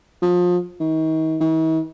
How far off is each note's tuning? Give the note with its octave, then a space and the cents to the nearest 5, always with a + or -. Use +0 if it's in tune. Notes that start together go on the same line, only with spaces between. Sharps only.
F3 +30
D#3 +35
E3 -45